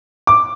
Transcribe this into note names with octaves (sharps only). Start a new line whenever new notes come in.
D6